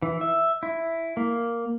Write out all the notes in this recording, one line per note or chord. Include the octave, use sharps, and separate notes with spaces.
E3
E5
E4
A#3